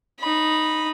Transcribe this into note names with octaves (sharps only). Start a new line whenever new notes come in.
D#4 B5